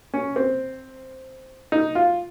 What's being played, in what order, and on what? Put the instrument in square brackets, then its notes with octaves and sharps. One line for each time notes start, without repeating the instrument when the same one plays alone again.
[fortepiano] C#4
C4
D#4
F4